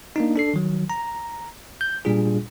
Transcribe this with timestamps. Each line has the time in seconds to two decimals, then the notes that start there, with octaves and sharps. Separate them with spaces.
0.16 A#3 D4 D#4
0.36 D4 A4 C7
0.54 D#3 F#3
0.90 A#5
1.81 G6
2.05 A#2 G3 D4 F4 G#4